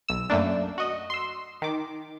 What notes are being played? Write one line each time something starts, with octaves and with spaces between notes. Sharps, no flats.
B1 E6
F#2 A3 A#3 D4
F#4 D#5
C6 E6
D#3 D6